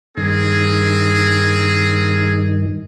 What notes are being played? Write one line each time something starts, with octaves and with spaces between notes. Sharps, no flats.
G2 D#3 A#3 C4 G#4